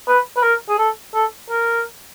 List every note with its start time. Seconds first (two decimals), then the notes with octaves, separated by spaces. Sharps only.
0.08 B4
0.37 B4
0.43 A#4
0.69 G#4
0.79 A4
1.15 A4
1.50 A#4